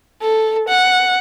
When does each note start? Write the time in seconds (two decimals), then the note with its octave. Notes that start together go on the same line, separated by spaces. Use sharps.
0.22 A4
0.69 F#5